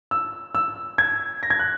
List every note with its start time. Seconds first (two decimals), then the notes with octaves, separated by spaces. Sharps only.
0.11 E6
0.55 E6
0.98 G#6
1.43 A#6
1.50 G#6
1.59 F#6